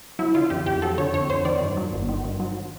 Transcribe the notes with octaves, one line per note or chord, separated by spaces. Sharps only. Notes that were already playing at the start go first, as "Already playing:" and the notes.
F#3 E4
D3 F4
F2 G4
F2 G4
F#3 A4
D3 C#5
F2 C#5
F2 C5
D#3 D5
G2
F#3
G1
D#3
G2
F#3